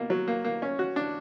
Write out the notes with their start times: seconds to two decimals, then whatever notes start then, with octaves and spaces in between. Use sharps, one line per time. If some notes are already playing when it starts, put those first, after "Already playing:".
Already playing: B2 A#3
0.10 F#3
0.28 A#3
0.44 A#3
0.62 C#4
0.79 F#4
0.96 D4